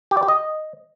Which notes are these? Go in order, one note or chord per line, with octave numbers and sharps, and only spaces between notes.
G4
D5
G4
D#5